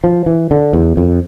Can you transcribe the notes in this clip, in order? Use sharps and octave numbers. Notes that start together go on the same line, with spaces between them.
F3
E3
D3
E2
F2